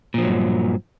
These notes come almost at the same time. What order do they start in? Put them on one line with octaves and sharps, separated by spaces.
A#2 F3 F#3 G2